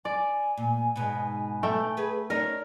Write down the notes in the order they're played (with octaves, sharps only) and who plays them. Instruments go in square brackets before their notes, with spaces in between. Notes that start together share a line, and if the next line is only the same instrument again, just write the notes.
[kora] D5 [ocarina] G#5
[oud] A#2
G#2 B2
[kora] A3 G5
[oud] G#4 B4
[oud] C#4 D#4 [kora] A#4 [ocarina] D5